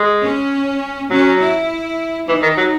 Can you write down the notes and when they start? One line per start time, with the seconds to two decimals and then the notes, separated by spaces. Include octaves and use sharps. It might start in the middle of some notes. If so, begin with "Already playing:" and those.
Already playing: G#3
0.22 C#4
1.10 F#3 C#4
1.39 E4
2.28 E3 D#4
2.43 D#3
2.57 F#3